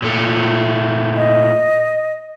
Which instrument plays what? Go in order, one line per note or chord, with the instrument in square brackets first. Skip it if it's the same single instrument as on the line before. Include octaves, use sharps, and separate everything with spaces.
[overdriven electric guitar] A#2 A3
[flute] D#5